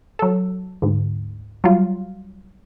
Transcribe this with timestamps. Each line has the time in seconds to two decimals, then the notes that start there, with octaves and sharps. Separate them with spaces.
0.19 F#3 A4
0.82 D2 G#2
1.64 F#3 G3 F4